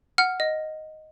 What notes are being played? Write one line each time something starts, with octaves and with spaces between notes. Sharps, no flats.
F#5 F6
D#5